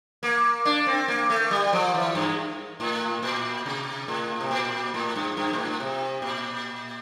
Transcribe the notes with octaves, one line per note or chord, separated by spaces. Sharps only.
A#3
D4
C4
A#3
A3
G3
F3
E3
G2
A2
A#2
C3
A2
C3
A#2
A2
G2
G2
A#2
A2
C3
A#2